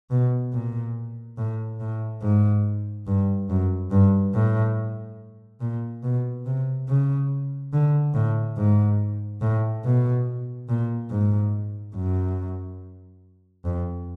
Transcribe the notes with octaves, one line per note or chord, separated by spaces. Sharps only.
B2
A#2
A2
A2
G#2
G2
F#2
G2
A2
A#2
B2
C3
C#3
D3
A2
G#2
A2
B2
A#2
G#2
F#2
F2